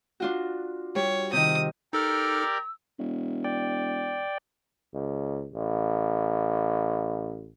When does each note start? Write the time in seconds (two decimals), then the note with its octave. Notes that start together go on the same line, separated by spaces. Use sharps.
0.20 D4 F4 F#4
0.95 G3 C#5
1.33 C3 D#3 D#6
1.93 D#4 G4 A4 A#4 D5 E6 F6
2.99 E1
3.44 D5 G5
4.94 C#2
5.53 A1